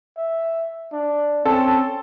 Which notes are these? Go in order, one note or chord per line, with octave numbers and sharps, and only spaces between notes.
E5
D4
C4 C#4 A4